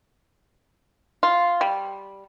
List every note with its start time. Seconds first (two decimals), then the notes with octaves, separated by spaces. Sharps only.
1.23 F4
1.61 G3